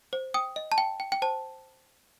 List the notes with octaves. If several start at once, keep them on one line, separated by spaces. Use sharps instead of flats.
C5
G5 D#6
D#5
A5
G5
G5
G5
C5 A5